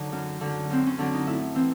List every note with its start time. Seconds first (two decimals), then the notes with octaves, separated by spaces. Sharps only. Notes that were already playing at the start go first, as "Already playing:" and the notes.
Already playing: D3 F#3 D#4
0.12 F#2
0.41 D3 F#3
0.70 F#2 C4
0.86 C#4
0.99 D3 F#3 D4
1.14 D#4
1.27 A2 E4
1.55 E3 C4